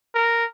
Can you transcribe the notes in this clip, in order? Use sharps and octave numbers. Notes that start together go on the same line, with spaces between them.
A#4